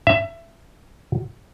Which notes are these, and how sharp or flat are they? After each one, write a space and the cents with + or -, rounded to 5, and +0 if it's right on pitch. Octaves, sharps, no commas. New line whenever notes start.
E5 +20